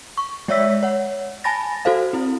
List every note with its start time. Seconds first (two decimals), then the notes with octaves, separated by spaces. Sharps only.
0.18 C#6
0.48 G#3 C#5 D5 E5 E6 B6
0.83 C#5 F#5
1.44 G#5 A5 B5 A6 A#6
1.85 F#4 A4 C5 F5
2.13 C4 E4